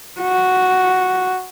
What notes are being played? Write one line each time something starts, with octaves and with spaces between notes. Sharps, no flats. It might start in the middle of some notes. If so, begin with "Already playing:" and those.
F#4